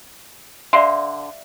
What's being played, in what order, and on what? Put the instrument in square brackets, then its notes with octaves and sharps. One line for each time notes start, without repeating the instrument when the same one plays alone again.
[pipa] D3 C6 [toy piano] D5 E5 F5